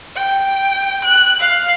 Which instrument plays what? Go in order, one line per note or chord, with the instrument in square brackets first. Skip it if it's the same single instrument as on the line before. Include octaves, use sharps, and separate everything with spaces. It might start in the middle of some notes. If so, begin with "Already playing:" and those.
[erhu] G5
F#6
F5